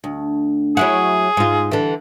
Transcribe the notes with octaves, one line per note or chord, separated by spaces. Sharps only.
D2
F#3 E4 F#4 G#4
G#2 F4
D3 E3